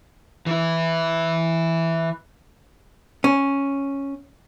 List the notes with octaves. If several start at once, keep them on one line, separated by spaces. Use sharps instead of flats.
E3 E4
C#4